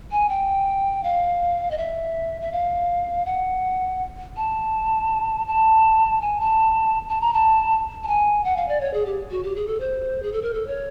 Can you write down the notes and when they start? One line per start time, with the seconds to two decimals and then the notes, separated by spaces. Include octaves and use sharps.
0.12 G#5
0.29 G5
1.04 F5
1.71 D#5
1.78 E5
2.41 E5
2.52 F5
3.26 F#5
4.37 A5
5.48 A5
6.22 G#5
6.40 A5
7.09 A5
7.21 A#5
7.34 A5
8.04 A5
8.08 G#5
8.44 F#5
8.56 F5
8.69 D5
8.81 C#5
8.94 G#4
9.06 G4
9.31 F#4
9.43 G4
9.56 G#4
9.67 A4
9.80 C5
10.23 G#4
10.33 A4
10.42 A#4
10.54 A4
10.67 C#5